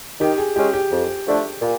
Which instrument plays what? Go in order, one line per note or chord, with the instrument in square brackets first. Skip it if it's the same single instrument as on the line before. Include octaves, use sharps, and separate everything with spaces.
[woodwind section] D#3 [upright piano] G4
[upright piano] G#4
[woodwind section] G#3 C#4 [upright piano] G4
[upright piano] G4
[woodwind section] F2
D3 F3 A3 D4
A#2